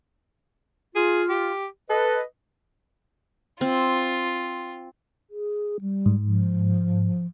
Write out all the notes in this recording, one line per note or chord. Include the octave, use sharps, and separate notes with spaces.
F4 G#4
G4
A4 B4 D#5
C4 F4
G#4
G3
G#2
F3